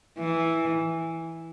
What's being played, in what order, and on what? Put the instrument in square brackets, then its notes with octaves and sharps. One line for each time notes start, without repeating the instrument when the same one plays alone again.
[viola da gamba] E3